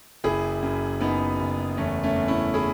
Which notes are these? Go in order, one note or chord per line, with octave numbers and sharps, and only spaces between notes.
F#1 E4 G#4
F#2
F#2 B3 D#4
F#1
E2 A3 C#4
A3 C#4
E2
C#4 E4
E4 G#4